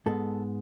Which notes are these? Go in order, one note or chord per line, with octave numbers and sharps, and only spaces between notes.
G#2 G#3 B3 A4